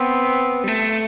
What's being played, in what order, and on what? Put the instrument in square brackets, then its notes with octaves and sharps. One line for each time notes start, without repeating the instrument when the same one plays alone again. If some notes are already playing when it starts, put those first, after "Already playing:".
Already playing: [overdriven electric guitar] B3 [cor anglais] C4
[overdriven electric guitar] G3
A3